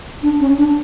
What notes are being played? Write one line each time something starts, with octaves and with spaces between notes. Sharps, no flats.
D4
C#4
D4